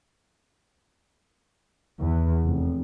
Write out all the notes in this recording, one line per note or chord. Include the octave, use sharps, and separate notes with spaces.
E2
F1